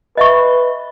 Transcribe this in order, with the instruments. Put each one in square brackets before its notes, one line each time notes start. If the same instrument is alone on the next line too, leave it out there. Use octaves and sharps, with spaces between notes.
[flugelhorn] B4 [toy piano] D#5 E5 C#6